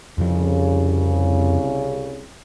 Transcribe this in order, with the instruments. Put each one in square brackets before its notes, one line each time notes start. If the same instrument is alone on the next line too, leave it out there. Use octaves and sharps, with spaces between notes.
[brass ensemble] C2 C#3 [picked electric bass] F2 F3